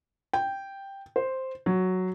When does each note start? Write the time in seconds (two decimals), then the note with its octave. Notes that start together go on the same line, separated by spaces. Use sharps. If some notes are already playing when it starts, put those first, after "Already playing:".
0.33 G5
1.16 C5
1.66 F#3